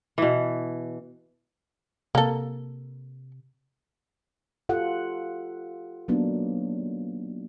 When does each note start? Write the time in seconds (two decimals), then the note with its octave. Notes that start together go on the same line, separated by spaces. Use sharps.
0.18 B2 E3
2.15 C3 A#3 A4
4.69 F4 G4 A4 F#5
6.08 F#3 A#3 B3 D4 D#4